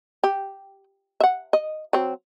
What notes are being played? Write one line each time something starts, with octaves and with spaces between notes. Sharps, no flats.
G4
E5 F#5
D#5
F#3 C4